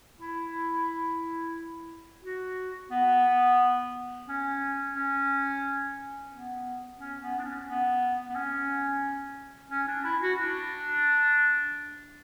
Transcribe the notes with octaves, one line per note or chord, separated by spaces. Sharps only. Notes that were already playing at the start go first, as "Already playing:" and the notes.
E4
F#4
B3
C#4
C#4
B3
C#4
B3
D4
C#4
B3
B3
C#4
C#4
D4
E4
F#4
D4